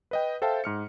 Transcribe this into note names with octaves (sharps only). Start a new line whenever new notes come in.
B4 D#5 G5
A4 C5 E5 F5 G5 A5
G#2 F6 C#7